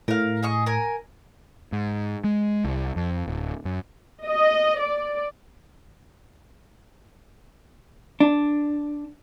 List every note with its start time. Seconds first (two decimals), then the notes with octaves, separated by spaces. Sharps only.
0.08 A2 A#4 F5
0.43 G#4 D#5 C#6
0.66 A#4 G#5
1.72 G#2
2.24 G#3
2.64 C2
2.96 F2
3.27 D1
3.65 F#2
4.25 D#5
4.80 D5
8.20 D4